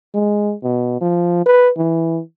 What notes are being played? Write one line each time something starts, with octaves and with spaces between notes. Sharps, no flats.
G#3
B2
F3
B4
E3